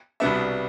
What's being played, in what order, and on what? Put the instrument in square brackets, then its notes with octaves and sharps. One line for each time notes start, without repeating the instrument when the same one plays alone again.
[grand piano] C2 B2 G3 B3 D4 E5